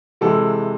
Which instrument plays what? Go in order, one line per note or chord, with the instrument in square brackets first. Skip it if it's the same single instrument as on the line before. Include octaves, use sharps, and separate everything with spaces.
[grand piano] C3 E3 G#3 A4